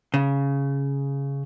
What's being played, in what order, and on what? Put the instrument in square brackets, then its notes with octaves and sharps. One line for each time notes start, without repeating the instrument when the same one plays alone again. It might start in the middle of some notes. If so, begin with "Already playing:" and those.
[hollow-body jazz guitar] C#3